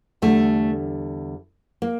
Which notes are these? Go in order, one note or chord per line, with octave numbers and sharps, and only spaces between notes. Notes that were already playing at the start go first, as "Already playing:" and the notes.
E2 D3 G3 A3
A#3